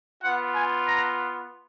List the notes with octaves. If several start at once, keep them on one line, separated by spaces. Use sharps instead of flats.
B3 F4 F#5
G#5
A#5